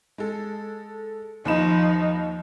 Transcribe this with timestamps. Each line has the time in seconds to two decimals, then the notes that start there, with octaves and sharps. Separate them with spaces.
0.18 G#3 A4
1.45 D#2 F3 D#4 B5 E7